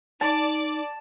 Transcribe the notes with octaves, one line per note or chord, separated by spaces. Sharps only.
D#4 D5 A5